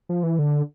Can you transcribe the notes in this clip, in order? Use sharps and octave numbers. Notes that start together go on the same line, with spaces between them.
F3
E3
D3